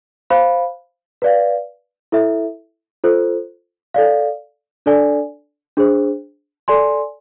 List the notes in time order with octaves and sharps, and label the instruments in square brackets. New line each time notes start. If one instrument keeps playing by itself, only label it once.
[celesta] C5 F5 B5
B4 D5 F5
E4 A4 E5
F4 A4 C5
A4 D5 F5
D4 A4 D5 G#5
D4 G#4 C5
A4 D5 G#5 C6